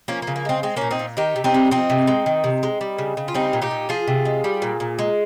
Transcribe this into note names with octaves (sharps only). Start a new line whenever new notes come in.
F3 A#3 C#4
A#3
C#3
A#3
G#3 C4
G#3 C4
A#2 A#3 C#4
C4 D#4
A#2
D#3 D#4 G4
C3
C4 D#4
G3
F3 C4 D#4
C3
G#3
D#3
C3
G#3
G3
C#3
C#3
F4
G3 C4 D#4
A#2
D#4 G4
A#2
F3 F4 G#4
C3
G#3
G3
A#2
A#2
G#3